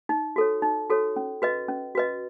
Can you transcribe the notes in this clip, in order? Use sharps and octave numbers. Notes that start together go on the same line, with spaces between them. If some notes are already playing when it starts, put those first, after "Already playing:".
D#4
F#4 A4 C#5
D#4
F#4 A4 C#5
C#4
F#4 B4 D#5
C#4
F#4 B4 D#5